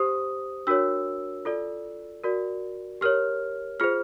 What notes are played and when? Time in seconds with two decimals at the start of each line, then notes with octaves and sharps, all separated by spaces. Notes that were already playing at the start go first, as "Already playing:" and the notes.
Already playing: G4 C5 D#6
0.67 D4 F#4 A#4 C#5 E6
1.45 F4 A4 D5
2.24 F#4 A#4 D5
3.01 G4 A#4 C#5 F6
3.80 F4 G#4 C5 F6